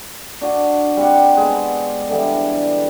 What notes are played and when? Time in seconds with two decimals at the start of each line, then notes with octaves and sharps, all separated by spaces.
0.41 D4 F#4
0.97 G3 C4 F#5
1.37 G#3 B3
2.09 D3 E3 G3